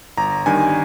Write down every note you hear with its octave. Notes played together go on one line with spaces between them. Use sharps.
G1 A#5
G2 D#3 G#5